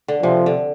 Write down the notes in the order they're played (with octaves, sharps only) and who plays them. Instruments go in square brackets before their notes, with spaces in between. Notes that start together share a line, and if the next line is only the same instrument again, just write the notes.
[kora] D3
[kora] C3 [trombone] F3
[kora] D3